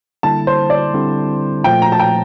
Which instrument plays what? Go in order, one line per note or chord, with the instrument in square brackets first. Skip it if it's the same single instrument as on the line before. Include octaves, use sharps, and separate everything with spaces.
[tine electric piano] D3 G3 A#3 E4 [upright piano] A5
[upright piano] C5
D5
[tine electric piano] D3 G3 C4 E4
[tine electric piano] A#2 F3 A3 [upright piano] G5
[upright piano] A#5
A5
G5